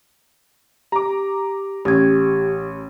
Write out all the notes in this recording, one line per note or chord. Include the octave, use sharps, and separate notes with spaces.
G4 A#5 D6
A1 G4 G#6